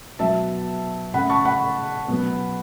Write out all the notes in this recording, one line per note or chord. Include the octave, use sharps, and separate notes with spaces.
B2 F#3 B3 E5 A5
C#3 A3 F#5 B5
A5 C#6
F#5 B5
B2 F#3 B3